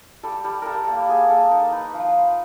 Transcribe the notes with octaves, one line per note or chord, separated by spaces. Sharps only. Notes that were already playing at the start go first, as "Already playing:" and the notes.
G3 A4
G3
G3 A4 A#4
A#3
A#3 G#4
A#3 A4
D#4 A#4
D#4 B4
F3 F4